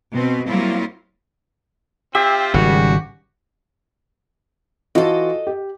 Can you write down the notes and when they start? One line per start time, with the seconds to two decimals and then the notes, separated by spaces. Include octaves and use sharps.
0.12 B2 C4 B4
0.47 F#3 G3 A#3 C4 E4 F4
2.15 C4 F4 G4 E5
2.54 G#1 C#3 G3 F#4
4.95 E3 F4 F#4 A4 D#5
5.47 G4